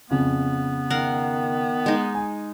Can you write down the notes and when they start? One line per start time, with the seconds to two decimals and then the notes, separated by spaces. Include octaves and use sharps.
0.10 F2 C#3 B3
0.90 D#3 A#4 F5 F#5
1.86 G#3 D#4
2.15 G#5